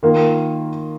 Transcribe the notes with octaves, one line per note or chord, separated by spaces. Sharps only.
D#3 A#3 F4